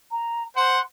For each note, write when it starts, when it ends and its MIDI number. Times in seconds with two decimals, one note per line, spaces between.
0.11 0.43 82
0.56 0.79 72
0.56 0.79 78
0.56 0.81 84